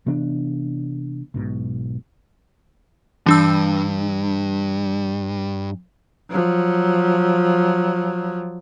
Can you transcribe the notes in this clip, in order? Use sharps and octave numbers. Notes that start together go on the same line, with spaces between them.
C3 E3 B3 D4
B1 G#2 B2
G2 E3 D4 E6
F3 F#3